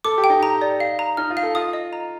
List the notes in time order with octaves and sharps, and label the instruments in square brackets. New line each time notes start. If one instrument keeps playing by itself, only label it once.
[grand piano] A4 [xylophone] D6
[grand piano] G4
[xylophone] G5
[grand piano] D#4
[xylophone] A#5
D5
F5
A#5
[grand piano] D#4 [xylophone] F6
[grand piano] F4
[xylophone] F5
[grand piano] A4
[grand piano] F4 [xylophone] D#6
[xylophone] D#5
A#5